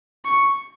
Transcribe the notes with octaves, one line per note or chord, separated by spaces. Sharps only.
C#6